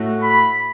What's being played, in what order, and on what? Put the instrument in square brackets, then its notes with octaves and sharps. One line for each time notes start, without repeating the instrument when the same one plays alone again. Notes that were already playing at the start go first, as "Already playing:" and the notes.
Already playing: [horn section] A2 A3 F#4
[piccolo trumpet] B5